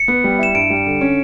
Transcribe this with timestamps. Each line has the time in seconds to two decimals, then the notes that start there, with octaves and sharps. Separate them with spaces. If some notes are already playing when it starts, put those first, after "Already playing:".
Already playing: C#7
0.08 B3
0.24 G3
0.39 E4 E7
0.54 G2 D7
0.70 G3
0.86 D3
1.01 C#4